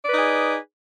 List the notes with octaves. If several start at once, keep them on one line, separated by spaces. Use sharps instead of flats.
D#4 G#4 B4 D5